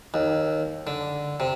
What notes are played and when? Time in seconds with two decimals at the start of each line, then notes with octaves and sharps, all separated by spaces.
0.14 D#2
0.87 D3
1.40 C3